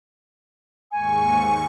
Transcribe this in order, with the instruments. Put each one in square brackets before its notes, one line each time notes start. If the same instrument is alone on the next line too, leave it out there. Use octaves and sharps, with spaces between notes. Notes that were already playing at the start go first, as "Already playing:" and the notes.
[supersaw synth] D#2 G#2 C#6 [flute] G#5